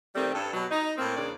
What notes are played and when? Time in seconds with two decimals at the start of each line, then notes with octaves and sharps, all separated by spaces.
0.15 D#3 G3 A3 C4
0.34 G2 A4
0.53 B2 F#3
0.70 D#4
0.98 A2 A#3 C4
1.17 E2 C#3 A#3 D4 D5